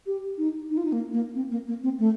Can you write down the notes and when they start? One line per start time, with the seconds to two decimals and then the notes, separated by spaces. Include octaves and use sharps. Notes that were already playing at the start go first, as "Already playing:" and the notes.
0.06 G4
0.38 D#4
0.70 D#4
0.77 F4
0.85 D#4
0.92 A#3
1.13 A#3
1.35 C4
1.51 A#3
1.67 A#3
1.83 C4
1.99 A3